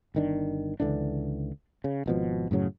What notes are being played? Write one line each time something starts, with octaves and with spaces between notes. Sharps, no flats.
G1 D#3 D4
C#2 D3 E3 D4
C#3
G#1 B2 F3
F#2 A2 C#3 F#3